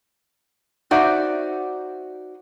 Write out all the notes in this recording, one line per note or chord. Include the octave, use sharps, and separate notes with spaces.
D#4 F#4 C5 D5 E5 F#5